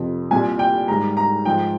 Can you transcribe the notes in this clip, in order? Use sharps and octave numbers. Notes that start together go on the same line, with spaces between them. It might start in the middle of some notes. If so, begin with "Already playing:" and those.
Already playing: F2 C3 F3
C2 A#2 G3 G#5
G5
G#2 D#3 G3 A#5
A#5
G#2 F3 G#3 G5